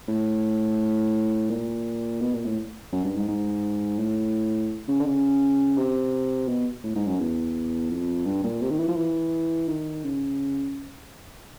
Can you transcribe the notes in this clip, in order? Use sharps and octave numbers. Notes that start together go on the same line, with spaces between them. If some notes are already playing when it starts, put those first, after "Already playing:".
A2
A#2
B2
A#2
A2
F#2
G2
G#2
G#2
A2
C#3
D3
C#3
C3
B2
A2
G#2
F#2
E2
F2
G2
A#2
C3
D#3
E3
F3
E3
D#3
C#3